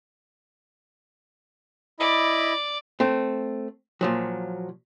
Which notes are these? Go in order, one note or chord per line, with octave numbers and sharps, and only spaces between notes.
E4 D5 D#5 B5
A3 C4
A#2 F3 F#3